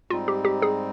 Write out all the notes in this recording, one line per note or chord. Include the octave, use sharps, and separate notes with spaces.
G#2 G3 C4 D#4 F4
G4
G4
G#4